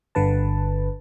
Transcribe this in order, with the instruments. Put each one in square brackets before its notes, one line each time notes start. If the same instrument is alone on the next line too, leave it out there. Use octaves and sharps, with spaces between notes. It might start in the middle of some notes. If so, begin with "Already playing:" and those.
[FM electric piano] G1 D3 B4 A5